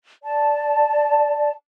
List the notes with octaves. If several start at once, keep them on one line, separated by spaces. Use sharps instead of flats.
D5 A5